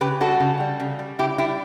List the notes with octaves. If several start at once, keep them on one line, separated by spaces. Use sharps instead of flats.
C#3 G4 B4
G3 F#4 A4
C#3
G3
C#3
G3
C#3 E4 G4
G3 E4 G4